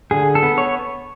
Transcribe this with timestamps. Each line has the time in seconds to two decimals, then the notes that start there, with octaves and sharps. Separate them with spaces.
0.11 D3 G#4
0.35 A4
0.43 B3
0.58 C#5